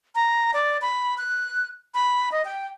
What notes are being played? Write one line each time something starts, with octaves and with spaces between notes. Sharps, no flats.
A#5
D5
B5
F#6
B5
D#5
G5